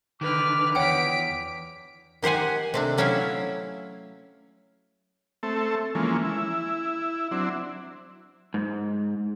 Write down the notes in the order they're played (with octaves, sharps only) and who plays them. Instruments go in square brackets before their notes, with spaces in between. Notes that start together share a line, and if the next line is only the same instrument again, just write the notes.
[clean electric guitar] D3 D#3 [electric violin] B4 F6 [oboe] D6
[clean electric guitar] E2 [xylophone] C#5 F#5 G5 [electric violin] B6 D7
[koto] D#3 G4 C5 F#5 G#5
C3 A3 D4
F#3 C#4 E4 E5 F5
[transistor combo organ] A3 C4 A4 E5
E3 F3 G#3 A#3 C#4
E4
F#3 C4 D4 E4
[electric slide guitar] G#2